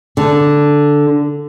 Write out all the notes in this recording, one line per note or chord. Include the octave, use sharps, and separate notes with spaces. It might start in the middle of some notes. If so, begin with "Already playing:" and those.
D3